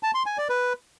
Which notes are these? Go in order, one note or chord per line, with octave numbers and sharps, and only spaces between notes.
A5
C6
G#5
D5
B4